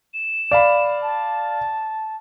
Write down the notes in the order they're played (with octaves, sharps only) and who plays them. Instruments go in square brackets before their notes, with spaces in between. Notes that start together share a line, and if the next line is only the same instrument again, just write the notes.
[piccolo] E7
[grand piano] D5 F5 B5
[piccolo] A5